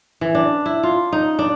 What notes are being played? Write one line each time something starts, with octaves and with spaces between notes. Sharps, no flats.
E3
D4
E4
F4
D#4
D4